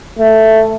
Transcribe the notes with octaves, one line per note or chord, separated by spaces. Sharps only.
A3